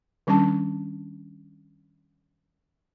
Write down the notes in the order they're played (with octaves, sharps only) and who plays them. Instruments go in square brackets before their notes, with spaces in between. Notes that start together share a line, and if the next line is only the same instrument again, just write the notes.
[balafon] D#3 G3 C#4 D4 A5